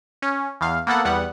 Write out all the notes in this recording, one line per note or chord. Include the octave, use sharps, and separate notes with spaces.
C#4
E2 F5
A#3 B3 A4 F#5
E2 G3 B3 F#5